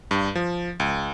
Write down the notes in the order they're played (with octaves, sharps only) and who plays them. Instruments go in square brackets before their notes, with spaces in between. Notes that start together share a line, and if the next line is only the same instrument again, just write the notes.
[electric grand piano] G2
F3
C#2